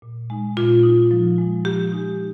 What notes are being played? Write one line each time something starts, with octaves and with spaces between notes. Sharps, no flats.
A#2
G#3 D#4
A#2 F4
G#3 D#4
F3
G#3 D#4
F3 G4
G#3 D#4